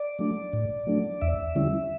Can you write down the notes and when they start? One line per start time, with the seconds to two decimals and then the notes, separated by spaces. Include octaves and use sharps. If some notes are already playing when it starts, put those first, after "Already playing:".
Already playing: D5
0.19 F#3 A3 D4
0.53 A2
0.87 F#3 A3 D4
1.21 E2 E5
1.55 D3 G3 C#4 E4